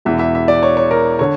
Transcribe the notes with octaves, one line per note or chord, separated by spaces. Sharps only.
E1 E2 E3 E5
E5
E5
D5
C#5
C#5
A#4
D3 C#5